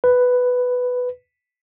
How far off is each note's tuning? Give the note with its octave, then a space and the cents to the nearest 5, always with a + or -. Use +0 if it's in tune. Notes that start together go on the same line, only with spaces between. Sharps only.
B4 +5